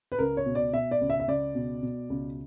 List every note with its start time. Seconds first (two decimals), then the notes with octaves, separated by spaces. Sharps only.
0.12 B4
0.19 C#2 A#4
0.37 C#5
0.46 B2
0.55 D5
0.73 B2 E5
0.91 D5
1.01 C#2
1.10 E5
1.20 E5
1.28 C#2 D5
1.55 B2
1.83 B2
2.10 C#2